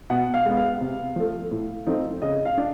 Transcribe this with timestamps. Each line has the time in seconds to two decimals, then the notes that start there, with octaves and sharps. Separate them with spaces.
0.10 B2 F#5
0.34 F5
0.45 G#3 B3
0.57 F5
0.81 C3
1.16 F3 A3
1.51 A2
1.87 F3 A3 C4 D#4
2.22 C#3 D#5
2.45 F5
2.58 D4